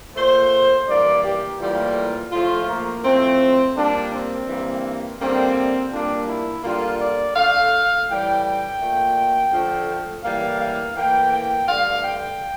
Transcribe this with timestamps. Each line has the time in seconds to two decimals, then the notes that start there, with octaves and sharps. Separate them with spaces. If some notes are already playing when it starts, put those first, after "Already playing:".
0.15 A#2 A3 C5
0.88 G2 E3 A#3 D5
1.24 G4
1.60 A2 E3 G3 A#3 F4
2.31 A2 F3 A3 F4
2.67 A#3
3.05 A2 F3 A3 C4
3.76 A#2 G3 A#3 D4
4.13 C4
4.48 G2 E3 A#3
5.20 D3 G3 A#3 C4
5.91 A#2 G3 A#3 D4
6.28 E4
6.64 D3 G3 A#3 F4
7.00 D5
7.36 D3 A3 F5
8.08 A2 E3 G3 G5
8.44 G5
8.80 A#2 A3
9.52 D3 F3 A3
10.24 A2 E3 G3 A#3 F5
10.60 F5
10.97 A2 E3 A#3 G5
11.33 G5
11.68 G2 D3 A3 F5
12.04 G5